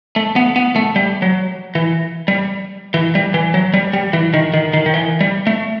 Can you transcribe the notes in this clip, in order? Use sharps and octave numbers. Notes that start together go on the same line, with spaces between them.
A3
B3
B3
A3
G3
F#3
E3
G3
E3
G3
E3
F#3
G3
G3
E3
D#3
D#3
D#3
D#3
E3
G3
A3